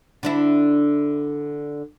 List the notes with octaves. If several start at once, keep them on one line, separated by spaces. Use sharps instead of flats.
D3 D4 E4